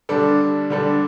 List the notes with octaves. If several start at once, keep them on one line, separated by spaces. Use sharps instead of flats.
D3 G3 D4 A4
D3 G3 D4 A4